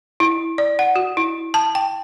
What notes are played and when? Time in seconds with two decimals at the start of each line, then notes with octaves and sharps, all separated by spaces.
0.20 E4
0.58 D5
0.79 F#5
0.96 F#4
1.17 E4
1.54 A5
1.75 G5